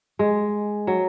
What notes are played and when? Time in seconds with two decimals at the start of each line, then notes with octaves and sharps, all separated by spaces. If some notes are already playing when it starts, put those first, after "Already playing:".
0.19 G#3
0.87 F#3